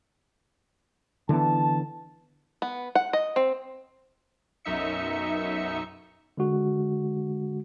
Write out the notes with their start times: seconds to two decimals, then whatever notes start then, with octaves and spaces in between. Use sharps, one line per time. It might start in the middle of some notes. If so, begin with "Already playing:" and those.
1.29 D3 E3 B3 A5
2.62 B3
2.95 F#5
3.13 D#5
3.36 C4
4.65 B1 F#2 D#4 E5 C#7
6.37 D3 G#3 F#4